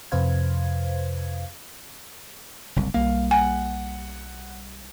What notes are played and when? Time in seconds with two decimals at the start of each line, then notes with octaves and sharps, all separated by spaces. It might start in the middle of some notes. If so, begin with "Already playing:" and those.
0.12 F2 C3 B4 C5 F5 G#6
2.76 F#1 C2
2.94 B1 G3 A#3 F5
3.31 F#5 G#5